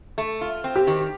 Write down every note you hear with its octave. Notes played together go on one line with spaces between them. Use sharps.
A3
F4
C4
G4
D#3